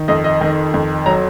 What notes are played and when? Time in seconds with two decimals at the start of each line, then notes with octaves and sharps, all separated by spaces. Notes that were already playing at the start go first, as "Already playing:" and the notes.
Already playing: D#3
0.08 F2 D#5
0.24 D#5
0.41 D#3
0.74 F2
1.06 F#3 A#5